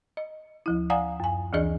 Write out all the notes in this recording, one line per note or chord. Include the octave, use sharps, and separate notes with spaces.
D#5
D2 F3 E4
D5 F5 F#5 G#5 A#5 D#6
F#2 G#5
D2 E3 D4 G#4 D5 D#5